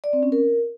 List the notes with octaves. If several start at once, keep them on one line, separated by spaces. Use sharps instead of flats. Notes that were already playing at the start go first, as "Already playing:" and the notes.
D5
C4
C#4
A#4